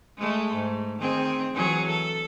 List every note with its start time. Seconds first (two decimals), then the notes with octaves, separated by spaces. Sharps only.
0.18 G#3 A3
0.54 G#2
1.00 D#3 C4 G#4
1.54 E3 F#3 G#4
1.89 A4